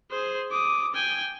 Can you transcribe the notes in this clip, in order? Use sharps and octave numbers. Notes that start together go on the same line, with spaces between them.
G#4 C5
D6 D#6
G5 G#5